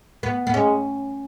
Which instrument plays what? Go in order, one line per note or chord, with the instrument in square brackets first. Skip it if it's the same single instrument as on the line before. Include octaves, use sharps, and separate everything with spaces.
[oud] B3
B3
[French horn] G#3 [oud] C#4